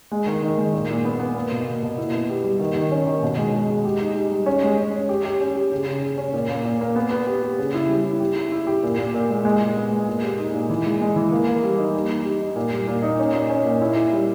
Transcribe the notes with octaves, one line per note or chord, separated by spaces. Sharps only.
G#3
D#3
D#3
G#3
A#2
A#2
B3
B3
A#3
B2
A#3
B2
E4
B3
G4
G3
D#3
D#3
C#4
D#3
B2
G#3
G#3
G#3
G4
D#4
G4
G3
C#4
G#3
C#4
C#4
G4
G4
C#4
G4
C#3
C#3
C#3
C#4
A#2
A#3
A#2
A#3
B3
B3
G4
G4
C#3
E4
G3
E4
G4
E4
E4
G4
A#2
A#2
A#2
G#3
G#3
A#2
B3
G#3
A#2
G4
D#4
A#2
E3
G#3
G#3
E3
A#3
A#3
G3
D#4
G3
D#4
G4
D#4
A#2
G3
A#2
D#4
C#4
A#2
C#4
A#2
E4
E4
G3